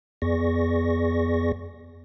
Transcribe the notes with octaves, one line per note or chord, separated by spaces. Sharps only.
F2 B3 G#4 D5 C#6 A#6